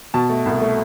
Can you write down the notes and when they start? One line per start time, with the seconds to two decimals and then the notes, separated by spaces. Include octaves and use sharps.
0.14 B2 A5
0.29 A3
0.45 C2
0.61 A3